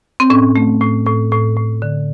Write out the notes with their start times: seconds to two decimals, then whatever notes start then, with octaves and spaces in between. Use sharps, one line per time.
0.20 C4
0.30 A2 C#4
0.56 A3
0.81 A2
1.06 A2
1.32 A2
1.57 A2
1.82 D3